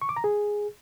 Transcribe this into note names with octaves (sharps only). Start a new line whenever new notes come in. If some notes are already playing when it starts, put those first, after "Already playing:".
C#6
D6
A#5
G#4